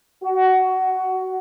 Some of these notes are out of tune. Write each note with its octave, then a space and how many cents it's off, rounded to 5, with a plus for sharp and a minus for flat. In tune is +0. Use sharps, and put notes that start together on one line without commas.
F#4 +15